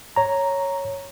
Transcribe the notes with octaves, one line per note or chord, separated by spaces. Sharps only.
C#5 A#5